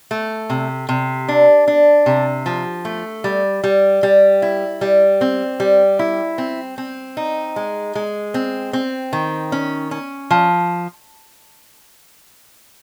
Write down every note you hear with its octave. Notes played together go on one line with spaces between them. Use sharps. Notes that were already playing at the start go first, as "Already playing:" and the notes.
A3
C3
C3
D4
D4
C3
F3
A3
G3
G3
G3
E4
G3
C4
G3
E4
C4
C4
D#4
G#3
G#3
C4
C4
D#3
C#4
C#4
F3